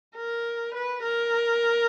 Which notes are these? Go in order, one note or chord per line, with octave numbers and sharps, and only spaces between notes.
A#4
B4
A#4